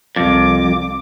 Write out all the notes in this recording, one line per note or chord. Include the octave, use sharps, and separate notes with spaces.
C2 F2 D6